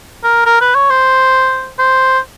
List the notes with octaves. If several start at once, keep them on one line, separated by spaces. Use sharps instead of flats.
A#4
A#4
B4
C#5
C5
C5